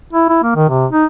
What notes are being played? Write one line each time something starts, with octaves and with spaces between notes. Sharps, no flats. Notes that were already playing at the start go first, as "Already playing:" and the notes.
E4
E4
A#3
D#3
C3
D#4